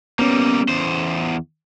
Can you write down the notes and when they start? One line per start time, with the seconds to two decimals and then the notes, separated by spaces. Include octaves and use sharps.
0.19 G3 A#3 B3 C#4
0.69 E2 C5